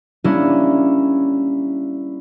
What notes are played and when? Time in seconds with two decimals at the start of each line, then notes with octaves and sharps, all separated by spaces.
0.24 G3 A#3 C#4 D4 E4